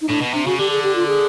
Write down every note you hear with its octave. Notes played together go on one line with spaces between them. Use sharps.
D#4
A2 D4
B2
C3 D4
C#3 F#4
D3 G4
G#4
G4
F4
G#4